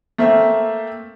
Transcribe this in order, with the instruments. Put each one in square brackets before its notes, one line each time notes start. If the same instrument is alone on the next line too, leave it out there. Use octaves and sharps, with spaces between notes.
[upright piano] A3 A#3 C4 E5